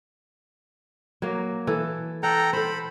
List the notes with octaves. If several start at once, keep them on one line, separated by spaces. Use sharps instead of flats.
F#3 A#3
E3 A4
A4 F#5 G5 A#5
A4 C5 B5